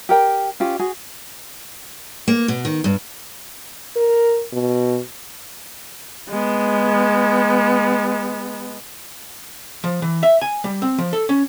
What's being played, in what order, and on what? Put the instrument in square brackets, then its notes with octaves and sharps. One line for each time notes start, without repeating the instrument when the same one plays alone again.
[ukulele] G4 A#4 G5
C#4 F4 G4
F#4 G#4
[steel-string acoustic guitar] A#3
B2
D#3
G2
[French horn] A#4
B2
[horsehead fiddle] G#3 B3
[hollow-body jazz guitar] F3
E3
E5
G#5
G3
C4
F3
A4
C#4